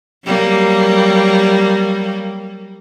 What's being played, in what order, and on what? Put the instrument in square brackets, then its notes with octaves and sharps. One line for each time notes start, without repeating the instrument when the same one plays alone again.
[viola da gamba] F#3 G3 A#3